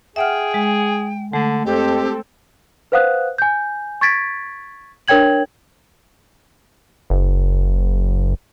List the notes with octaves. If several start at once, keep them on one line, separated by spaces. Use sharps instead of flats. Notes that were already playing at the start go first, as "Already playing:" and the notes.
G#4 E5 F#5 G5 F6
G#3
D3 A3
F2 C4 G4 A4
B4 C5 F5 F#5 D#6 F#6
G#5 G6
C#6 G#6 A6 B6 D7
D4 A#4 C#5 G5 G#6 F#7
F#1